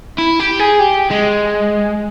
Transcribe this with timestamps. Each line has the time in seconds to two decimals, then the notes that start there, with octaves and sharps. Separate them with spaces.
0.18 E4
0.40 G4
0.60 G#4
0.80 G4
1.11 G#3